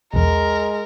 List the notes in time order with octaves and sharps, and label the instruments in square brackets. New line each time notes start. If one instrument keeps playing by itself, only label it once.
[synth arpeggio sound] B1 E2 [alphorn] G#3 [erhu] A#4